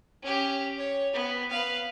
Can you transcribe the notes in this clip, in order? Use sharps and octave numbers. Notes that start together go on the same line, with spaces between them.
C#4 G4
C#5
B3
B4 F5